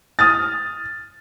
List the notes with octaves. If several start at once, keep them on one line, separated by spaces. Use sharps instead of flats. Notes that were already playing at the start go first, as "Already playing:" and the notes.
D#6 F6 A6